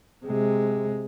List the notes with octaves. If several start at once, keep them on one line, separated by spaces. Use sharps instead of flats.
C3 G#3